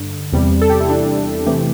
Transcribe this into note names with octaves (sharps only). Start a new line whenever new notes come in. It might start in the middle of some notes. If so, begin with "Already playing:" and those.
Already playing: G2 D3
E2 C3 G3
A4
G4
E4
D4
C3 E3 A3 G4